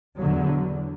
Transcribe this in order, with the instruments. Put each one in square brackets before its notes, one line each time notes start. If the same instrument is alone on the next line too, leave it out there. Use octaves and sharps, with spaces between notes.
[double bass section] E2 D3 F#3